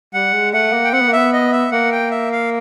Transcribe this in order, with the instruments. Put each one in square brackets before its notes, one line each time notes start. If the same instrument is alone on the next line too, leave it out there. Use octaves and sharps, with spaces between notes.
[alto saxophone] G3 [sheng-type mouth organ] F#5
[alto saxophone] G#3
[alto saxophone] A3 [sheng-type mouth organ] F#5
[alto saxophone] A#3
[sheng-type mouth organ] G5
[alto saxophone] C4 [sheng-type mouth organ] F#5
[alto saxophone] B3
A#3
[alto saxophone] B3 [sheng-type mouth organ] E5
[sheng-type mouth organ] D#5
E5
[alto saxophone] A#3 [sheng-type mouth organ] F#5
[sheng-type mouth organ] G5
E5
F5